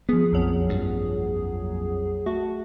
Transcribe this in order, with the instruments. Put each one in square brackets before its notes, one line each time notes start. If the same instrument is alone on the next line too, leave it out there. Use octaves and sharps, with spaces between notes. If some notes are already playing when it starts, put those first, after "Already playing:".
[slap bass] F3 B3 [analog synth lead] G#4
[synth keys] A#1 F2 F#3
[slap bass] G2
[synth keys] A3 [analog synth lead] F#4